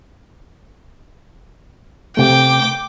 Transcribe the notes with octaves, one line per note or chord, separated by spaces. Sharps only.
C3 A3 G5 D6